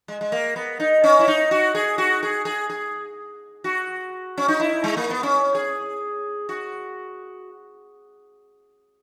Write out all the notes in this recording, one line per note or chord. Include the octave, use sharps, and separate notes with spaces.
G#3
G#3
A#3
B3
D#4
C#4
E4
D#4
F#4
G#4
F#4
G#4
G#4
G#4
F#4
C#4
D#4
E4
G#3
A#3
B3
C#4
G#4
F#4